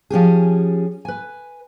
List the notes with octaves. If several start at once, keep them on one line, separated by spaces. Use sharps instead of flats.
F3 C#4 G4 G#4
B4 G#5